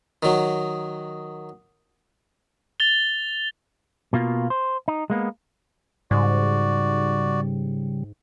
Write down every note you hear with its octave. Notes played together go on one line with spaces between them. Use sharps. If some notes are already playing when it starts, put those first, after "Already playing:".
D#3 F#3
A6 F7 G7
B2 A#3 F4
C5
D#4
G#3 A#3 B3
G#2 C#3 G3 F#4 D5